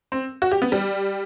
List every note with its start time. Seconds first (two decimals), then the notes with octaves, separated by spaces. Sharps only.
0.12 C4
0.42 F#4
0.51 G4
0.62 B3
0.72 G3